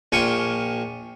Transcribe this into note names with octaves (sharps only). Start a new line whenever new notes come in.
A#1 F4 G5 G#5 C#6